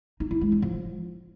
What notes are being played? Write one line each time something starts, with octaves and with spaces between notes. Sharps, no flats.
D#4
E4
G#3
D4
F3